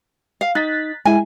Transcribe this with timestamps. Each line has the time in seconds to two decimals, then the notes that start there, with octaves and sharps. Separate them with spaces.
0.41 F5
0.55 D#4 F#6 A6 B6
1.05 G#3 E4 G#5